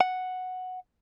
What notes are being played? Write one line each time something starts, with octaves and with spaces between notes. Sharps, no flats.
F#5